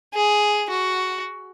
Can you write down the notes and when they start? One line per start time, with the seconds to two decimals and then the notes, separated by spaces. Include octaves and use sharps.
0.14 G#4
0.70 F#4